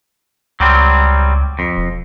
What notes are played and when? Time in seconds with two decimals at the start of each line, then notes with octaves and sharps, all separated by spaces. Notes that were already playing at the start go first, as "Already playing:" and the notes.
0.60 C#2 F#3 G3 C4
1.59 F2
1.77 E1